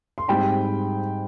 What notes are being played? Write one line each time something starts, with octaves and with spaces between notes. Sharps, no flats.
C6
G#2 G3 C4 G5 B5